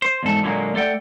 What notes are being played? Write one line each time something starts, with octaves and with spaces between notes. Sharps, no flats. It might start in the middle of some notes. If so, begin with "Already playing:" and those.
C5
E2 G#2 A4
A#2 D3 F#3 G#3 A#3
A3 A4 D5 F#5 G5